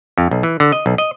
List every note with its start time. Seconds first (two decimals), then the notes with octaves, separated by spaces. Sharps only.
0.18 F2
0.31 B1
0.43 E3
0.60 D3
0.72 D#5
0.86 B1
0.98 D#5